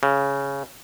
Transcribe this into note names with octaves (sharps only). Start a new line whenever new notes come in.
C#3